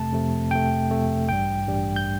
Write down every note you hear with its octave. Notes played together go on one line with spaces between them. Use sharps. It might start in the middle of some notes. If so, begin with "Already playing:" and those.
Already playing: F2 C3 A3 A5
F2 C3 A3
F2 C3 A3 G5
F2 C3 A3
A1 G2 G3 G5
A1 G2 G3
G6